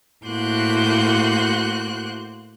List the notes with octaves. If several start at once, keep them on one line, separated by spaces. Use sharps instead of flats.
A2 A#3 F#4 C5 F#6 G6